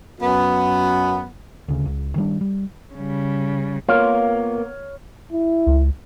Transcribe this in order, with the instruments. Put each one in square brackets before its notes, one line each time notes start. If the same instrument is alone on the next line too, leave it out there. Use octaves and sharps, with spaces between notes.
[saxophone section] F#2 B3
[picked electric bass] D2 C#3
C#2
D#3 G3 D4
G3
[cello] C#3 G3
[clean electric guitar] A#3 B3 A#4 [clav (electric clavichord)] F4 [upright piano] C#5 F6
[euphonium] E4
[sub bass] C#2